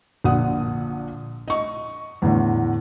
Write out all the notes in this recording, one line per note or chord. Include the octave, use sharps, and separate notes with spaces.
A#1 A#2 D3 F#5 D#6
D#5 C#6
E2 A2 D3